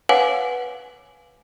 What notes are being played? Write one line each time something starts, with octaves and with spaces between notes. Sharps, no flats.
B4 C#5 F5 F#5 G#5 D6